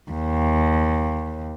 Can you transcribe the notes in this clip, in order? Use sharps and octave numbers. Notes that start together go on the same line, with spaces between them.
D#2